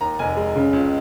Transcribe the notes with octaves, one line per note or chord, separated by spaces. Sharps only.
D#2 A#5
F1 G#5
G#3
C#3
C#2